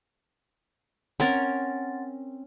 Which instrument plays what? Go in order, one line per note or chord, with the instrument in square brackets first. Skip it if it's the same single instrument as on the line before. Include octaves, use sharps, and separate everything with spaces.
[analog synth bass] C4 [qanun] C#4 A#4 [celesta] F#5 C6 A6